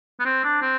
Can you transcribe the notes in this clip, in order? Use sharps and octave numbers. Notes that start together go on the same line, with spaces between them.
B3
C4
D4
C4